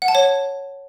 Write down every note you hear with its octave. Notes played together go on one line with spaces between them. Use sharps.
F#5
A5
C#5